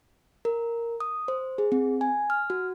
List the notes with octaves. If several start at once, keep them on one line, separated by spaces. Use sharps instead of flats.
A#4
D#6
C5
G#4
C4
G#5
F6
F#4